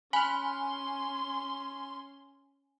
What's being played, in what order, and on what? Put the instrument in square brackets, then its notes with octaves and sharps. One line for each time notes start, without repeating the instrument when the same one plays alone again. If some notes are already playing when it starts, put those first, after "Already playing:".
[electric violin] C#4 C6 [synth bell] G#5 [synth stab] B5 F6